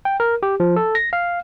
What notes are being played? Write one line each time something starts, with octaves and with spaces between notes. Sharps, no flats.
G5
A#4
G4
F3
A4
A#6
F5